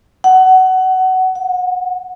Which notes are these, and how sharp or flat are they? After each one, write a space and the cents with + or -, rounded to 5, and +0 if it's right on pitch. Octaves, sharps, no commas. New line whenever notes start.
F#5 +20
F#5 -30